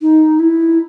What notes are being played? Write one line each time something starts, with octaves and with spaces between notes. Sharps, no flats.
D#4
E4